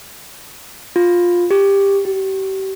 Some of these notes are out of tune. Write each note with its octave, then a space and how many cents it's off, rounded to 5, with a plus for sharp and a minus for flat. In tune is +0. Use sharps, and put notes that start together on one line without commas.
F4 +10
G4 +15
G4 -35